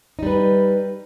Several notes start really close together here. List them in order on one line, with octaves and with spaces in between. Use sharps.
D#4 G3 B4